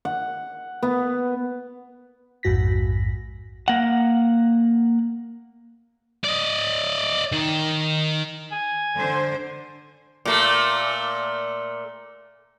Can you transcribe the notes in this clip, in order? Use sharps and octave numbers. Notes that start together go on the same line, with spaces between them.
F#5
B3
A#1 F2 G#2 F#4 A#6 B6
A#3 F#5
D5 D#5
D#3
G#5
D3 C5
A#2 A3